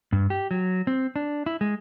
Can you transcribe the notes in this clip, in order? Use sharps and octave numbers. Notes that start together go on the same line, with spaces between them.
G2
G4
F#3
C4
D4
E4
G#3